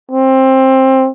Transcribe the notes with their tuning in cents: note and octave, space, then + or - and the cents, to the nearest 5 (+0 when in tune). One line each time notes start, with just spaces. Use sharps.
C4 +15